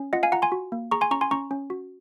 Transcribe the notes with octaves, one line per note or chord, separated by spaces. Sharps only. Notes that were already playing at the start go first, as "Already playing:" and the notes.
Already playing: C#4
F4 D#5 F#5
F5 G#5
F4 F#5 A#5
G#5 C6
F#4
A#3
G#4 A#5 C#6
G#5 C6
C#4 A#5 C#6
G#5 C6
C#4 A#5 C#6
C#4
F#4